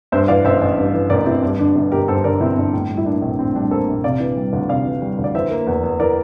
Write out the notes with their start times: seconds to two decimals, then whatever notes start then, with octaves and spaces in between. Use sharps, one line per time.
0.12 G2 C5 E5
0.28 E3 D5 F5
0.45 A1 C5 E5
0.61 A1
0.78 G2
0.94 E3
1.10 A1 A#4 D5
1.26 A1 C4 E4
1.42 G2 D4
1.59 D3 D4
1.75 G1
1.92 G1 G4 A#4
2.08 G2 A4 C5
2.24 D3 A#4 D5
2.40 G1 C4 E4
2.56 G1 D4
2.73 A2
2.90 G3
2.97 E4
3.06 A#3 D4
3.22 A#1 C4
3.39 A2 C4
3.55 G3 D4
3.71 A#3 A4 C5
3.88 A#1
4.04 C3 D5 F5
4.20 E3
4.37 G3
4.53 D2
4.69 C3 D5 F5
4.86 E3
5.02 G3
5.19 D2
5.24 D5
5.35 E3 C5 E5
5.50 A#3
5.67 E2
5.84 E2
6.00 E3 A#4 D5